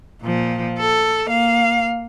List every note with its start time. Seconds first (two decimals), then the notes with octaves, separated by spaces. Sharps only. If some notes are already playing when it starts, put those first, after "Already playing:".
0.22 A#2 F3
0.79 A4
1.26 A#3 F5